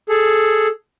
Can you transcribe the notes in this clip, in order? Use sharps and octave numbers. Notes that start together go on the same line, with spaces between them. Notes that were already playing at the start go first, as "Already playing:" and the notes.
G#4 A4